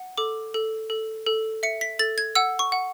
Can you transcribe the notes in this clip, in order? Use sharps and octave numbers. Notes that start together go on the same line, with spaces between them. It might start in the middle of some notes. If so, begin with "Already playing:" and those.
Already playing: F#5
A4 D6
A4
A4
A4
E5 C#7
B6
A4 A6
G#6
F#5 E6
C#6
F#5